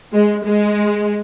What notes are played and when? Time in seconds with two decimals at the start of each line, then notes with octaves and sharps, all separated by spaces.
0.12 G#3
0.43 G#3